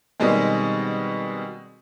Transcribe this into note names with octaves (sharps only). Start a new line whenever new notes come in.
B2 D#3 G3 G#3 C4